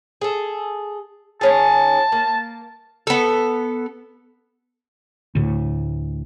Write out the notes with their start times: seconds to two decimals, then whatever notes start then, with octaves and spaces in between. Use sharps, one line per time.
0.21 G#4 A4
1.41 D#3 C#4 G#4 A5
2.12 A#3
3.07 B3 A4
5.35 D2 A2